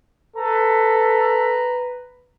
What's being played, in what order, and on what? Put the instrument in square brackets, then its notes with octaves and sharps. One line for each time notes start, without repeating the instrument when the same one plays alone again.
[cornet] A4 [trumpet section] B4 A#5